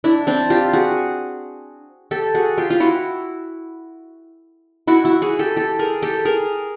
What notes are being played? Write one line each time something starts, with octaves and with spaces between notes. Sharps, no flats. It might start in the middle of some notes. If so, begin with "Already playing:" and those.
D4 E4
C4 D4
F4 G4
F#4 G#4
G4 A4
F#4 G#4
F4 G4
F4
E4 F#4
E4 F#4
E4 F#4
F#4 G#4
G4 A4
G4 A4
G#4 A#4
G4 A4
G#4 A#4